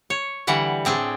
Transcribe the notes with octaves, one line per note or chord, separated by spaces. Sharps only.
C#5
D3 E3 G3 F#5
A2 C4 D4 G#4